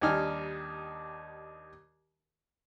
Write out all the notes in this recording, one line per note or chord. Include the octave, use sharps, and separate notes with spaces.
D#2 G3 D4 D#4 G#5 F6